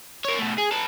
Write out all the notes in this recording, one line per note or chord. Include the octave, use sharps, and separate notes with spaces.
A#4 C#5
B2 A3
G#4
A4 B4